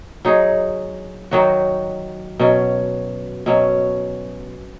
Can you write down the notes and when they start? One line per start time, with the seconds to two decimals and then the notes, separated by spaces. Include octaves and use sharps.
0.25 F#3 D#4 G#4
1.31 D#3 F#3 D#4 F#4
2.40 B2 F#3 C#4
3.46 B2 F#3 C#4